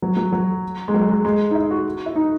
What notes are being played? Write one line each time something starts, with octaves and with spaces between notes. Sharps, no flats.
F#3
F#3
F#3
G#3
F#3
G#3
G#3
D#4
E4
F#4
E4
D#4